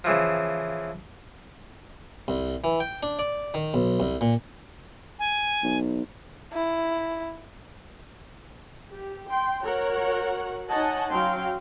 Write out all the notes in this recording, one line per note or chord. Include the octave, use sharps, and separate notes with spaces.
C#3 E3 F3
C2
E3
G5
D4
D5
D#3
B1
C2
A#2
G#5
B1
E4
G4
G5 C6
F#4 A#4 C#5 F#5
D#4 C#5 D#5 F#5 G#5 A5
F#3 C#4 F5 G5 C6